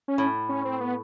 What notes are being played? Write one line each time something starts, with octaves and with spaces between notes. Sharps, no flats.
C#4
A2
C#4
C4
B3